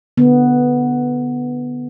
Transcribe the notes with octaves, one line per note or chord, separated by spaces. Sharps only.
D3 B3